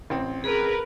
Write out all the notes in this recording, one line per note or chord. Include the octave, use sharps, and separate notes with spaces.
A1 C4
G#4 A#4 B4